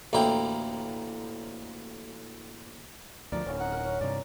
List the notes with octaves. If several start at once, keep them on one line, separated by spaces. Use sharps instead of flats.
A1 D2 A#3 E4 G5
D2 D#3 F3 A#4 D5
D1 C#4
D#4 F#5
A#4
C#4
G2 C3 D5